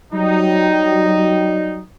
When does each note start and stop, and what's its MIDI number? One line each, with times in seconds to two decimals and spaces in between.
0.13 1.79 54
0.13 1.79 55
0.13 1.79 63